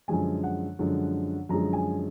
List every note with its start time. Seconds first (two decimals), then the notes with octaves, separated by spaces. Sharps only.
0.08 F#2 D3 F3 G#3 G#5
0.44 F#5
0.79 F#2 D3 F3 G#3
1.49 F#2 D3 F3 G#3 A#5
1.73 G#5